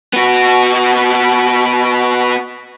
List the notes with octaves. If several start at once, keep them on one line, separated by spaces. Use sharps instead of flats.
B3 F#4